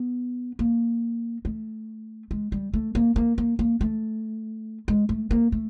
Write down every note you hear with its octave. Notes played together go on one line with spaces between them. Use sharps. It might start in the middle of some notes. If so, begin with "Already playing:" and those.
Already playing: B3
A#3
A3
G#3
G3
A3
A#3
A#3
A#3
A#3
A3
G#3
A3
A#3
A3